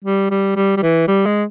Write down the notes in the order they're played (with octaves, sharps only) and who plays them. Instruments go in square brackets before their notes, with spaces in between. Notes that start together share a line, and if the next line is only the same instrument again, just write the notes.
[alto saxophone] G3
G3
G3
G3
E3
G3
G#3